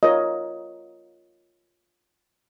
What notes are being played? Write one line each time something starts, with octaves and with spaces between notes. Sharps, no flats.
F4 A#4 C#5 D#5